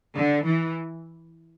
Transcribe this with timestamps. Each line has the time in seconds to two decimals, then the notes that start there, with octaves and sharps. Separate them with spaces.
0.15 D3
0.45 E3